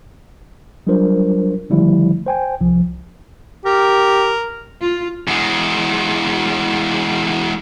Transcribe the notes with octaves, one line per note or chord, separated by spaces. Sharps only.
F#3 G3 D4 F4 A#4 C5
D3 D#3 F3 G3 A3 E4
C5 G5 G#5
C2 F3
G4 A#4
F4
E2 G#3